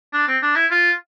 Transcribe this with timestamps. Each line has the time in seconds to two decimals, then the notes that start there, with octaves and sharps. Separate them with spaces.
0.13 D4
0.28 C4
0.43 D4
0.56 E4
0.71 F4